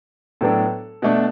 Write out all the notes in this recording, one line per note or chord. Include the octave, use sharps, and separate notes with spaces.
A2 F#3 B3 D4 A4
B2 A3 D4